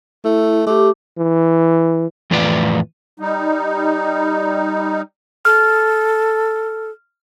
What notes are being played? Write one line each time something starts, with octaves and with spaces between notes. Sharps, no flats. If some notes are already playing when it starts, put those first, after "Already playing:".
A3 E4
A3 G4 D6
E3
F2 A2 E3 F4 B4 D5
G3 D#4
A4 F6